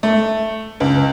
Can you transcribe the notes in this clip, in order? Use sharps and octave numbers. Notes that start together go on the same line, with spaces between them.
A3
C#2